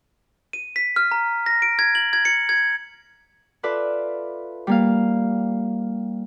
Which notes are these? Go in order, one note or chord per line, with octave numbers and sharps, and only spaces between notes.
D#7
B6
F6
A#5
A#6
D7
G#6
F#7
G#6
C#7
G#6
F4 A4 B4 D5 E5
G3 A#3 F5